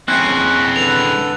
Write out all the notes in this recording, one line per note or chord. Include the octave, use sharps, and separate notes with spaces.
G#3 C4 C#4 E4 F#6
D3 A4 B4 F7